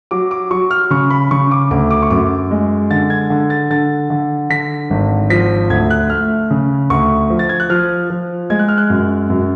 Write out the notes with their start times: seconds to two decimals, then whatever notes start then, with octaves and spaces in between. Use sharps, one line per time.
0.11 F#3 D6
0.31 D6
0.51 F#3 C#6
0.71 F6
0.91 C#3 C#6
1.10 B5
1.31 C#3 C#6
1.51 D6
1.71 D2 D6
1.90 D6
2.02 C#6
2.10 F#2 D6
2.51 G#3
2.91 D3 A6
3.10 G#6
3.30 D3
3.50 A6
3.70 D3 A6
4.10 D3
4.50 D3 B6
4.90 G#1
5.30 F3 B6
5.70 D2 G#6
5.90 F#6
6.10 A3 F6
6.51 C#3
6.90 D2 C#6
7.30 F3
7.39 A6
7.49 G#6
7.60 F#6
7.70 F3 F6
8.10 F3
8.50 G#3 G#6
8.59 F#6
8.68 F6
8.78 F#6
8.90 F#2
9.30 F#2